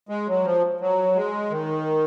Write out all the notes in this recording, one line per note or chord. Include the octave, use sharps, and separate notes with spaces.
G#3
F#3
F3
F#3
G#3
D#3